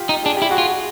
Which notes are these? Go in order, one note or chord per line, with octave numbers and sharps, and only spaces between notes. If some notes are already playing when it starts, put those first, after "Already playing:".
Already playing: F4 G4
D#4
D4 G#4
E4 G4
F#4 G#4
F4